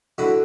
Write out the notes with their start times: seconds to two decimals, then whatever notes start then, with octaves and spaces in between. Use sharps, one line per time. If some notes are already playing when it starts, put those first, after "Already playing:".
0.18 D3 E4 F#4